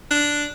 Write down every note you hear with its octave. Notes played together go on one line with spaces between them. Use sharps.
D4